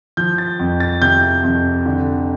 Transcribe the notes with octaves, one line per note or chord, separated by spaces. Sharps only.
F3 G6
A6
F2
A6
C3 G6
F2
D3